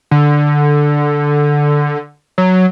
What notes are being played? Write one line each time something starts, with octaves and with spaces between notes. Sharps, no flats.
D3
F#3